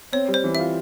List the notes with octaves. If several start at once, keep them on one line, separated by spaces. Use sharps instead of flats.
C4 C#5
G3
C5
E3
F4 E5